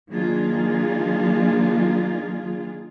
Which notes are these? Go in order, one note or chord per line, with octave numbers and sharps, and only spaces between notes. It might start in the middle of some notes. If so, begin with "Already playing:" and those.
D#3 F#3 A#3 D4 F4 G#4